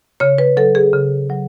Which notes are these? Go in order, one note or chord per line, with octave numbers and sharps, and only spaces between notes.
C#3 C#5
B4
F#3 A4
G#4
C#3
F#3